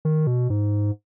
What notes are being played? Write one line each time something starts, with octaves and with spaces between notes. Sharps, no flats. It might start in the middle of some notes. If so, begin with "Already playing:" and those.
D#3
B2
G#2